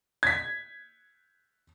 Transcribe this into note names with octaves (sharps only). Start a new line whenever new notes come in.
G#6 B6